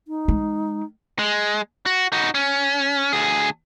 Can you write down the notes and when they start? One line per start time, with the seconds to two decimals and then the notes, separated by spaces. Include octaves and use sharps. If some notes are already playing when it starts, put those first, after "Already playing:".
0.08 D#4
0.28 G#3
1.19 G#3
1.86 F#4
2.12 D#4 F#4
2.35 C#4
3.13 D2 G#4